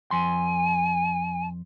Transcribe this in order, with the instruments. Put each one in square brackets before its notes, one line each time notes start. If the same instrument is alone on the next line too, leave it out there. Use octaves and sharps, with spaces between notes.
[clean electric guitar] F2 C6 [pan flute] G#5